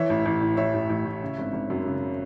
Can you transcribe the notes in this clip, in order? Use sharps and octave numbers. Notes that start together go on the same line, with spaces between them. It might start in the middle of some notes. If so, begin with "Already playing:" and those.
Already playing: E3 C#5 E5
A1
A1
A2
E3 C#5 E5
A1
A1
A2
C#3
G#1
G#1
F#2
C#3